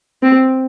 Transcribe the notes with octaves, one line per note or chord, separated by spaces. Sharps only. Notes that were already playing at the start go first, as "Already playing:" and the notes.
C4